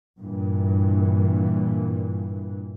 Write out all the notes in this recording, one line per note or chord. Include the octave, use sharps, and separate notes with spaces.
G2 A#2 E3